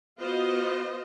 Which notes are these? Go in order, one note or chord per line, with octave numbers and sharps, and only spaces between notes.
B3 F4 F#4 C5 D#5